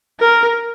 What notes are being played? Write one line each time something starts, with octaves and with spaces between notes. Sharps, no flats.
A#4